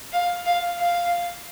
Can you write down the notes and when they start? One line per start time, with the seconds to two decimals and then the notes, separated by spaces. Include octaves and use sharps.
0.13 F5
0.46 F5
0.79 F5